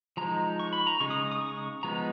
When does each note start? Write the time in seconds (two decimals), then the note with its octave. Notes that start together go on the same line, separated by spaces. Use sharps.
0.17 F3 G#3 D#4 A#5
0.60 C#6
0.73 B5
0.87 A#5
1.00 C#3 G#3 D#4 C#6
1.10 D#6
1.32 D#6
1.42 C#6
1.83 F3 G#3 B3 D#4 A#5